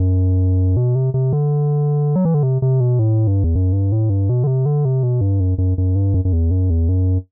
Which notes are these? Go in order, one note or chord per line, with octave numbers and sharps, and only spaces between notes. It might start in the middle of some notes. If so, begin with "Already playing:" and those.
Already playing: F#2
B2
C3
C3
D3
F#3
E3
D3
C3
C3
B2
A2
G2
E2
F#2
G2
A2
G2
B2
D3
C3
D3
C3
B2
G2
F#2
F#2
F#2
G2
F#2
F#2
E2
F#2
E2
F#2